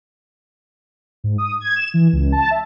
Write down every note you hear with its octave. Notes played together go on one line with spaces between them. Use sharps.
G#2
D#6
G#6
E7
E3
C#2
A5
E5